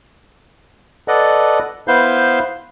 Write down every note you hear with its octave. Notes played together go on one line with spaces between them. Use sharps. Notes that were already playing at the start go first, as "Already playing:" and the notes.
A4 B4 D5 D#5 F#5
B3 E4 B4 C5 F5 G6